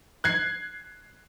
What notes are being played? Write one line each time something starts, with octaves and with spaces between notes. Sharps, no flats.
F#6 G#6 C7